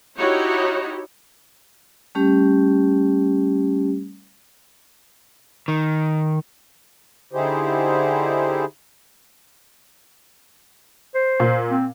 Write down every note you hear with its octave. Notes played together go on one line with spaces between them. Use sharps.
D#4 E4 F#4 G4 C#5
G3 A3 C#4 G4
D#3
D3 D#4 E4 G4 G#4 C5
C5
A#2
C4